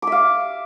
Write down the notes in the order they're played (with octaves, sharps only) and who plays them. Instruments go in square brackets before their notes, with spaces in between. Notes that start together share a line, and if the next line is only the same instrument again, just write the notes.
[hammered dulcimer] D6
E5
F5